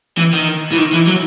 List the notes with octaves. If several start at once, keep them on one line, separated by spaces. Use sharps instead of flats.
E3
D#3
E3
D#3
E3
F#3